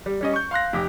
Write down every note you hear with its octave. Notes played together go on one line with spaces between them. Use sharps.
G3
G3 C#4 D#5
C#6 G6
F5 C6 F#6 A#6
F1 G4